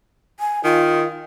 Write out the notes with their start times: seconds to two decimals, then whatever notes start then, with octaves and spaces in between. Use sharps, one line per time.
0.40 G#5
0.64 D#3 F4